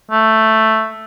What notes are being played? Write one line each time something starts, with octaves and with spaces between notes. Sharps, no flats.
A3